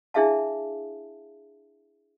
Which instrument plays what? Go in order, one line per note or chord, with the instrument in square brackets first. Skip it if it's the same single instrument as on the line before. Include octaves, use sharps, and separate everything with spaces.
[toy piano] D4 E4 G#4 E5 F5 A5